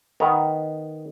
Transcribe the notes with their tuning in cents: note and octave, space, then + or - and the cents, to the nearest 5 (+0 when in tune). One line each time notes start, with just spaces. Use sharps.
D#3 +0 B3 +0 A#5 +0